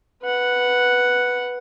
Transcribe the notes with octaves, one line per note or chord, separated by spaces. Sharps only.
B4 F#5